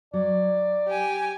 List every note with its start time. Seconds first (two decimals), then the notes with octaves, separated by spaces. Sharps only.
0.14 F#3 D5
0.87 G4 G#5